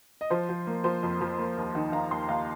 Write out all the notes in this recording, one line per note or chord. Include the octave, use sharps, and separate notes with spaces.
D#5
F3 C5
F3
A#3
F3 C5
F2
F3
A#3
D#2
D#3
D#3 F5 A#5
D#2 G5 C6
D#2 F5 A#5